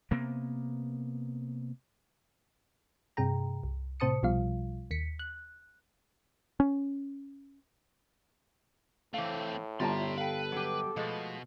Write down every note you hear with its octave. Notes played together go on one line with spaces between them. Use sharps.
C3 A#3 B3
G2 C3 G#4 G5 A#5
C2
A2 C3 C5 A5 D#6 C#7
B1 B2 F3 G3 F4 F5
D#2 B6 C#7
F#6
C#4
A2 E3 A3 C4 F5
G1 G3 F4 E5 A5 A#5 C6
A4 B4 F5 G5
F#3 G4
B2 F3 G#3 A3